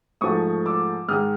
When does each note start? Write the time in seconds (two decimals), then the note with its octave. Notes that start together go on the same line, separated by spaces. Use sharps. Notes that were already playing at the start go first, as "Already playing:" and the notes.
0.21 G#2 F3 A3 C#6 D#6
0.66 D6 E6
1.08 G#2 D#3 G#3 D#6 F6